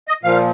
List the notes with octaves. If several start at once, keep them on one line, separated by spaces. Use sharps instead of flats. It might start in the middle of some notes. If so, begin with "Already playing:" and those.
D#5
A#2 F3 F5